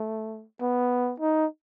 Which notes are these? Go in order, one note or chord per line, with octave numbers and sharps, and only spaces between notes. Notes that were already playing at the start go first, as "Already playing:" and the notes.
Already playing: A3
B3
D#4